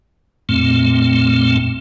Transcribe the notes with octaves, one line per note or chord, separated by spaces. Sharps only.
F2 A#2 A3 C4